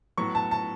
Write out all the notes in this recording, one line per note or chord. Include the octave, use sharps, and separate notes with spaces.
A2 F#3 B3 C#6
A5
A5